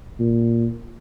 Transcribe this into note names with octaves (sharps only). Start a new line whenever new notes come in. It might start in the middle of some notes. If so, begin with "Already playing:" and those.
A#2